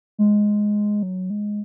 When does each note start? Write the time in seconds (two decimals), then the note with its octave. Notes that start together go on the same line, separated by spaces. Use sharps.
0.18 G#3
1.03 F#3
1.30 G#3